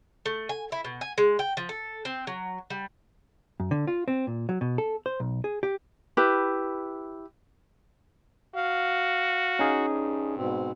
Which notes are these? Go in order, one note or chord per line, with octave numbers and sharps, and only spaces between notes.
A3
G#5
E4
B2
G#5
G#3
G5
F3
A4
C4
F#3
G3
F#2
D3
F4
C4
A#2
F#3
B2
A4
C5
B1
G#4
G4
E4 G4 B4
F#4 F5
C#4 D#4 G#4
G2
G#2 B2 C4